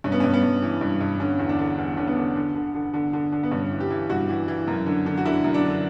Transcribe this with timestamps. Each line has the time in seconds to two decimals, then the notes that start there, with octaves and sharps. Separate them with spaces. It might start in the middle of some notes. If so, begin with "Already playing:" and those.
0.04 G2 C#4
0.12 B3
0.20 C#4
0.24 G2
0.33 B3
0.43 G2
0.62 E3
0.81 G2
1.01 G2
1.20 D3 C#4
1.39 E2
1.49 D4
1.59 D3
1.78 E2
1.97 D3 C#4
2.07 B3
2.16 D3
2.36 D3
2.55 D3
2.75 D3
2.94 D3
3.13 D3
3.32 D3
3.43 B3
3.51 G2 C#4
3.71 E3
3.80 G4
3.90 E3
4.10 G2 F#4
4.29 E3
4.48 E3
4.68 F#2
4.86 D3
5.06 D3
5.17 F#4
5.25 D3 E4
5.44 F#2
5.54 D4
5.64 D3